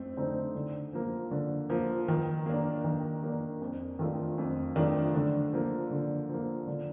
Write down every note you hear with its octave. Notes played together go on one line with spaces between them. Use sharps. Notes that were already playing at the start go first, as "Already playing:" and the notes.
Already playing: F2 A3 C4
D3 A3 C4 D#4
D3
F3 A#3
D3
F3 A#3
D#3
A#3 D4
D#3
A#3 D4
F2
D#3 A3 D4 F4
F2
D#3 A3 D4 F4
D3
F3 A#3
D3
F3 A#3
D3